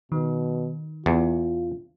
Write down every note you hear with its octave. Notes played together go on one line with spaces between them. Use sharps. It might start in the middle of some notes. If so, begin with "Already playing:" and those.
B2 D#3
E2 F4